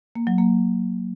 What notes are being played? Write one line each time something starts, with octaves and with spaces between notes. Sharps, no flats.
A#3
F#3
A#3